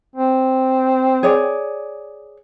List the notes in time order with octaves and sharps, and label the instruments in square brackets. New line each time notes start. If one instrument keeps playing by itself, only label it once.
[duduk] C4
[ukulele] G#4 C#5 D5